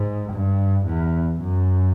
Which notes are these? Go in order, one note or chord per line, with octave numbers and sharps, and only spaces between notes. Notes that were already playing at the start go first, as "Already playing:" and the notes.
Already playing: G#2
G2
E2
F#2